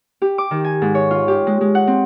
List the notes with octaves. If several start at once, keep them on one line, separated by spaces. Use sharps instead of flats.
G4
D6
D#3
G#5
G#2
C#5
F4
G4
G#3
G#3
F#5
C4